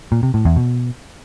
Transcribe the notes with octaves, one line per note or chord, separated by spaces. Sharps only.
A#2
C3
A2
E2
B2